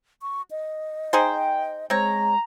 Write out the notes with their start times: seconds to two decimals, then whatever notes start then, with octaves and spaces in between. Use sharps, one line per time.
0.22 C#6
0.51 D#5
1.13 D#4 G#4 C5 G5
1.90 G#3 C4 C#5 A#5